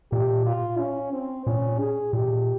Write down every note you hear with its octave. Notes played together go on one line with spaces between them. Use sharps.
A#2 G4
F4
C#4
C4
A#2 C#4
G#4
A#2 G4